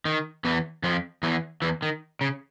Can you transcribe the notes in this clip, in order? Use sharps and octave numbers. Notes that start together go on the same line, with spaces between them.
D#3
E2 E3
F2 F3
E2 E3
E2 E3
D#3
C#3